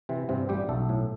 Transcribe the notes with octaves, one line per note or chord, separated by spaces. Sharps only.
C3 E3 C4
G2 C3 C4
A1 G3 G4
B1 A3 A4
A2